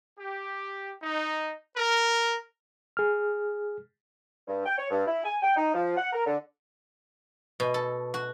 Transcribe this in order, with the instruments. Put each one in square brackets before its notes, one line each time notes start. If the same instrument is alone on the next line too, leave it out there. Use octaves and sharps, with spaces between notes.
[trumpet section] G4
D#4
A#4
[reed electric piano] G#4 F6
[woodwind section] G2
G5
C#5
G2
E4
G#5
G5
D#4
F3
F#5
A#4
D3
[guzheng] B2
A4
F#4